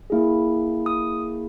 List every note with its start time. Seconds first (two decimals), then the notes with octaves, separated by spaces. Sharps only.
0.10 A#3 E4 G#4
0.86 D#6